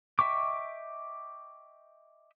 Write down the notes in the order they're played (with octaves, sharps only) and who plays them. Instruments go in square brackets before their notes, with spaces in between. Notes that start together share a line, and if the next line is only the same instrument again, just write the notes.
[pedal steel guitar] D#5 E5 G5 C#6 D6